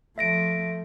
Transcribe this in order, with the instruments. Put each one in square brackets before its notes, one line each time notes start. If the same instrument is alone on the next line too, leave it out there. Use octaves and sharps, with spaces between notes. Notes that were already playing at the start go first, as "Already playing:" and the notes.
[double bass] F3 A3 [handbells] E5 A#6 D7